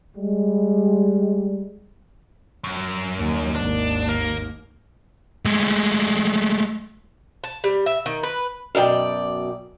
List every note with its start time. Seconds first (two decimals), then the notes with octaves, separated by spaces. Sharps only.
0.16 G3 G#3
2.64 F#2
3.18 D#2
3.56 G#1 D#2 D4
4.09 A#3
5.45 G#3 A3
7.44 A5
7.64 G3
7.86 E5
8.06 D#3
8.23 B4
8.75 F#2 B2 D5 G5